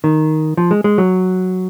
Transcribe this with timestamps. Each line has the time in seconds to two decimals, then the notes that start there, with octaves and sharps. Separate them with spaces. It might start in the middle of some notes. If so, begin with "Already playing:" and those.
0.04 D#3
0.57 F3
0.71 G#3
0.84 G#3
0.98 F#3